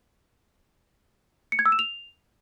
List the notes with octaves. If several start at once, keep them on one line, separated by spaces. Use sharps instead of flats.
C#7
G#6
E6
E7
F7